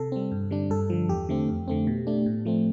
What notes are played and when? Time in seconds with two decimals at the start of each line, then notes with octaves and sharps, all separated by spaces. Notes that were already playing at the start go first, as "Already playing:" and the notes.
Already playing: C3 A4
0.12 G3 C4
0.32 G2
0.51 D3 G3 D4
0.70 G2 A4
0.90 D3 F3
1.09 E2 G4
1.29 D3 A3 C4
1.49 F2
1.68 D3 A3 C4
1.87 B2
2.07 A3 D4
2.26 A2
2.45 F3 A3 C4